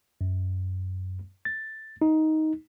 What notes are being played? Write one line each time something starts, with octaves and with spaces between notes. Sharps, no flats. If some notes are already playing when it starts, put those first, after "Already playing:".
F#2
A6
D#4